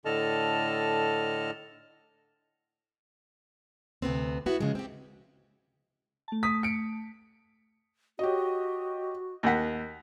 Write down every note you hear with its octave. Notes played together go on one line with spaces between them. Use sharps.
A2 D3 A4 D#5 A5 F6
D2 C3 B3 C4
B3 E4 F#4
C#3 F3 G#3
C4 G4
A3 A5
D#6 B6
C#7 D7
F#4 G4 C#5 D#5
D#2 F#5 A#6 B6